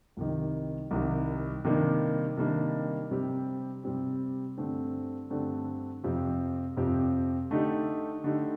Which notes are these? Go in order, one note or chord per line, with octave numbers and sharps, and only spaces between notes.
C2 C3 D#3
C2 C3 D#3
C3 D#3 G3 A#3 D4
C3 D#3 G3 A#3 D4
C3 G3 C4 G4
C3 G3 C4 G4
G2 D3 A3 C4
G2 D3 A3 C4
F2 C3 F3 C4 G4
F2 C3 F3 C4 G4
D3 A3 D#4 G4
D3 A3 D#4 G4